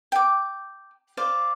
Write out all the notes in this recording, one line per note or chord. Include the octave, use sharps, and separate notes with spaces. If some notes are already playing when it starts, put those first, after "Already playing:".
G5 D6
C5 D5 F5